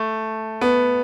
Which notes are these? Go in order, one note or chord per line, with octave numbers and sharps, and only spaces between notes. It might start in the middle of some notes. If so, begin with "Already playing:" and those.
Already playing: A3
B3